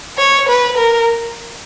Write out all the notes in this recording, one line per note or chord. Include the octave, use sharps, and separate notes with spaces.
C#5
B4
A#4